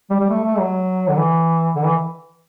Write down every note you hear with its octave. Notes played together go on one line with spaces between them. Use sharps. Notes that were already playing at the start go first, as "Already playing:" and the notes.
G3
G3
A3
A3
F#3
D3
E3
D3
E3